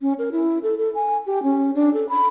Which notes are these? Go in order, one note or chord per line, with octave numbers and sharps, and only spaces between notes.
C#4
A#4
E4
A4
A4
G#5
G4
C#4
D4
A4
B5